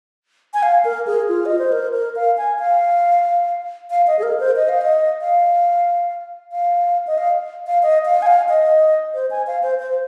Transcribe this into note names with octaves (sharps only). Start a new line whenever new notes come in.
G#5
F5
A#4
G#4
F4
D#5
C5
A#4
A#4
F5
G#5
F5
F5
D#5
G#4
A#4
C5
D#5
F5
D#5
F5
F5
D#5
F5
F5
D#5
F5
G#5
F5
D#5
C5
G#5
F5
C5
C5